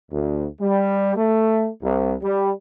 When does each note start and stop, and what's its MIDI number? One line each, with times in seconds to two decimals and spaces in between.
0.11 0.46 38
0.60 1.13 55
1.16 1.68 57
1.82 2.14 36
2.23 2.50 55